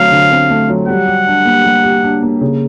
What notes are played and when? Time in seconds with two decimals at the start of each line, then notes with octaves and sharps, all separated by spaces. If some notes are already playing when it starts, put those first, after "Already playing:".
Already playing: D3 F#3 A3 C4 F5
0.11 D3
0.31 C4
0.50 A3
0.69 F#3
0.88 G3 F#5
1.07 G4
1.27 D4
1.45 A#3
1.64 G3
1.84 G4
2.03 D4
2.22 A#3
2.41 C#3